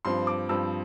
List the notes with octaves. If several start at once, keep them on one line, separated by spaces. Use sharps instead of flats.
G2 F3 C4 C6
D6
G2 F3 C4 E6